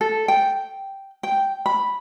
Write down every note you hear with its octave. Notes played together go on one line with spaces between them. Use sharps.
A4
G5
G5
B5